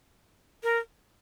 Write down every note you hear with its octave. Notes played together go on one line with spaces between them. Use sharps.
A#4